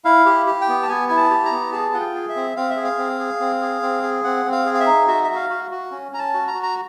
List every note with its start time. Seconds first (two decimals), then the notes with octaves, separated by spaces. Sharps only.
0.05 E4 F5
0.26 G4
0.46 G4
0.61 G5
0.68 B3
0.83 A5
0.89 B3 G#5
1.09 E4 G#5
1.17 A5
1.30 G4
1.45 A#5
1.52 B3
1.73 G#4 A5
1.94 F4 F#5
2.00 G5
2.14 G#4
2.29 E5
2.36 C4
2.57 C4 F5
2.70 E5
2.77 G#4
2.84 F5
2.98 C4
3.20 G#4
3.40 C4
3.61 G#4
3.82 C4
4.03 G#4
4.24 C4 F#5
4.45 C4
4.52 F5
4.66 G#4
4.74 F5
4.80 E5
4.86 D#4
5.07 F#4 E5
5.24 F#4 E5
5.35 F5
5.50 F#4
5.71 F#4
5.91 C#4
6.12 C#4 A#5
6.19 A5
6.34 F#4
6.47 A#5
6.54 F#4
6.63 A#5